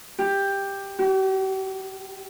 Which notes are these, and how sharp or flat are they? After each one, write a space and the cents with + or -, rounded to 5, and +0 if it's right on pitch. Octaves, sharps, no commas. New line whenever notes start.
G4 +10
G4 -45